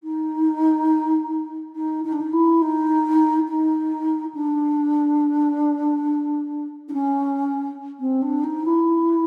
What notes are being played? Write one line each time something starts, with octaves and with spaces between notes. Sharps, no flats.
D#4
D#4
D#4
D4
D#4
E4
D#4
D#4
D4
D4
C#4
C4
D4
D#4
E4